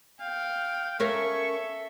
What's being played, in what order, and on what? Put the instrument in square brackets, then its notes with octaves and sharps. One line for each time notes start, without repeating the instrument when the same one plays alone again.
[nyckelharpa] F5 [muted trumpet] G5
[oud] C#4 A#4 F5 [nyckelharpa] A4 E5 [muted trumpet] C#6